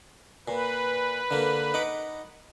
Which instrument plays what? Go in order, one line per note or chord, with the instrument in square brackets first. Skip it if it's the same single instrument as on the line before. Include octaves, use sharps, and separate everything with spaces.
[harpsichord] A#2 [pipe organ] B4
[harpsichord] D3 A#3
D#4 F#5 D6